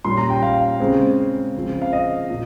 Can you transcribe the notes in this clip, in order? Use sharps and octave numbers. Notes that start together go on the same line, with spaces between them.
A#2 G3 C#4 C6
A#5
G5
F5
C#3 G#3 C4
C#3 F3 C4
F5
D#5
A#2